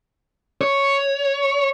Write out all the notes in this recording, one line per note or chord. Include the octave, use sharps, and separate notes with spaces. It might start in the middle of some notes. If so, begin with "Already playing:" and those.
C#5